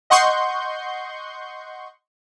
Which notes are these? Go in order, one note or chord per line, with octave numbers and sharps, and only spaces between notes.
D#5 F#5 C6 C#6 G6